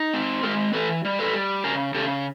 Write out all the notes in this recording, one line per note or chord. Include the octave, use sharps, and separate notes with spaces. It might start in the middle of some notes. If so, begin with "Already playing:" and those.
Already playing: D#4
C4
G#3 G#4 A#4
E3 A4 B4
G3
A4 B4
G3
C#3 G#4 A#4
C#3 G4 A4